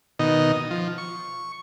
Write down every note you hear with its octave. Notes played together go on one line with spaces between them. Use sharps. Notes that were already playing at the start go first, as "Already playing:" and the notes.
B2 D#3 D#4
F3
C#6